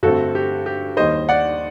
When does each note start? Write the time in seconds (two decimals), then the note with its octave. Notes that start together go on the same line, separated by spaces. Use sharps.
0.03 G2 D3 A3 C4 F#4 A4
0.35 G4
0.66 G4
0.97 D#2 D#3 G3 C5 D#5
1.29 D5 F#5